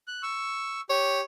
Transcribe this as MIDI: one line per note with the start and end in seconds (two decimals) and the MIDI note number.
0.08 0.22 90
0.23 0.81 85
0.23 0.81 88
0.90 1.21 67
0.90 1.22 73